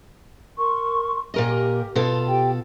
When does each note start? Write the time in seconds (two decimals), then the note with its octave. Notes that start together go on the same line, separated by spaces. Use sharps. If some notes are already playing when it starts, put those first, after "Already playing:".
0.57 A#4 C6 C#6
1.34 A#2 G4 A#4 D#5
1.95 B2 F4 A4
2.28 G4 G5